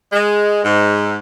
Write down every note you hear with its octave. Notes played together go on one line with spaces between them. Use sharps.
G#3
G#2